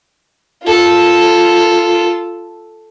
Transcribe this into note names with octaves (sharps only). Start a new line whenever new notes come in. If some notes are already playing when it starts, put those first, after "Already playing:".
F4 A4